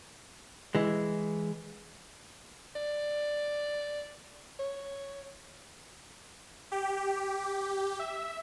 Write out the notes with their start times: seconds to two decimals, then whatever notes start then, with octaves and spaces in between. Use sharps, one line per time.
0.75 E3 G#3
2.76 D5
4.59 C#5
6.72 G4
7.99 E5